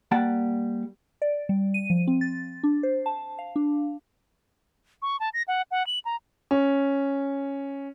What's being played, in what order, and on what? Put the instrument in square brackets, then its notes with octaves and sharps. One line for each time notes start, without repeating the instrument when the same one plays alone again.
[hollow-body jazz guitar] G3 A#3 F#5 G5 A5
[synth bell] D5
G3
D#7
F3
C4
A6
D4
C5
A5
F5
D4
[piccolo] C#6
A5
A#6
F#5
F#5
F#7
A#5
[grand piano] C#4